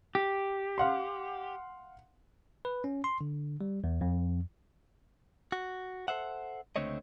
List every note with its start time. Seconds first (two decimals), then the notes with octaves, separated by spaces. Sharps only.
0.15 G4
0.78 F5 F#5 C6
2.65 B4
2.84 C#4
3.04 C6
3.21 D3
3.61 G3
3.84 E2
4.01 F2
5.52 F#4
6.08 A4 C5 E5 F#5
6.76 C#2 D3 A3 C4 C#5 D#5